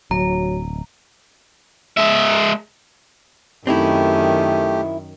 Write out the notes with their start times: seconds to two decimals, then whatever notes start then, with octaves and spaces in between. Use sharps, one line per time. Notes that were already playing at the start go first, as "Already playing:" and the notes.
0.11 D1 F#3 A#5
1.97 G#3 E5
3.67 F#2 D#3 A3 C4 D#4 E4 G4